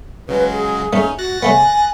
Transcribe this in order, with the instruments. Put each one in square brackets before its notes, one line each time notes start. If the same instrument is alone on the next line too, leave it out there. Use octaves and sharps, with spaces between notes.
[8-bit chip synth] C#3 F#3 G#3 [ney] B4
[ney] G#4
[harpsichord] A#1 A3 [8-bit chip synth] C#4 D#4
[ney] F#4 [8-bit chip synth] F#6 A6 A#6
[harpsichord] C#3 A3 B3 [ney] G#5